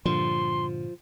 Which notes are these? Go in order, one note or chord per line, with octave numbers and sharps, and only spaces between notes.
G2 A#2 D3 F3 C6